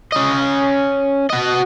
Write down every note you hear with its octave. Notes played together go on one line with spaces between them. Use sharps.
C#4 D#5
F#4 D#5